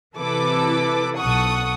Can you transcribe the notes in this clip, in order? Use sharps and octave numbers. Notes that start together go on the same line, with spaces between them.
C3 E3 E4 A4 B4 D6
B1 A4 F#5 C#6 D#6